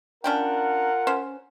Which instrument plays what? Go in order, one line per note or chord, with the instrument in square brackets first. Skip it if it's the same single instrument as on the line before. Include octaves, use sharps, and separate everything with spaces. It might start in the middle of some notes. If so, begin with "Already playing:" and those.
[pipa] C#4 D4 G5 [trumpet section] F4 A#4 F#5
[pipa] C#4 C5